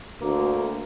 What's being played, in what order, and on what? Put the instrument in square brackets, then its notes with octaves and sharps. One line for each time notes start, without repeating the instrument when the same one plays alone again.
[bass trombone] D2 [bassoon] A#3